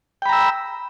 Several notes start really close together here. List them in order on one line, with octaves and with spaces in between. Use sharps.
G5 B5 A#5 E6